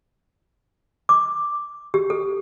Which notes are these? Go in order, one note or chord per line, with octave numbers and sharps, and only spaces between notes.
D6
G4
A4